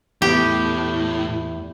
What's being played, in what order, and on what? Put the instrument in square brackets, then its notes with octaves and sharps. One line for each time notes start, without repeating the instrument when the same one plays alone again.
[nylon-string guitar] E2 [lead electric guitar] A2 [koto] G4